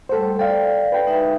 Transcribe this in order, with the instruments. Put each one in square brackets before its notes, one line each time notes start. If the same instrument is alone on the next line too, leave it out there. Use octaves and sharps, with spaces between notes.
[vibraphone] G3 A3 F#5 [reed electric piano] A4 C5
[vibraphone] A4 D5 [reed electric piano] F5 G5
[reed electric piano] B4 G5
[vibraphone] G#3 D#4 E5